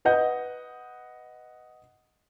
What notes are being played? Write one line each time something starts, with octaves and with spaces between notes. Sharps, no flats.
B4 D#5 F#5 G6